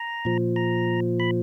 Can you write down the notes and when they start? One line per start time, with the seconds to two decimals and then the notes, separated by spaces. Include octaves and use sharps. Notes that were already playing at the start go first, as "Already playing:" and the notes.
Already playing: A#5
0.25 A#2 F3
0.56 A#5
1.20 B5